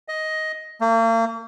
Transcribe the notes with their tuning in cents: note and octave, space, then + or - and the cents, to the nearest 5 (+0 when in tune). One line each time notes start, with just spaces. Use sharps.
D#5 +10
A#3 -40